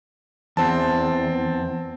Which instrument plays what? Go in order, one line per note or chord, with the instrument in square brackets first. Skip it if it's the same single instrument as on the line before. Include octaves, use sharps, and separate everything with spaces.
[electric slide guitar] E2 [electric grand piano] C4 A5